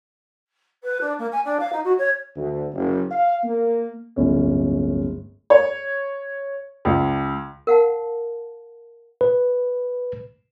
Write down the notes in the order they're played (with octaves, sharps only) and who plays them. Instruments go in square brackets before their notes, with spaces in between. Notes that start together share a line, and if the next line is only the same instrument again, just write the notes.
[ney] B4
D4
A#3
G#5
D4
F5
D#4
F#4
C#5
[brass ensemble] D2
F#1
F5
A#3
[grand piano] D1 G1 C#4
[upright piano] C#5
C#2
[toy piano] A#4 F5 F#5 A5
[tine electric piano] B4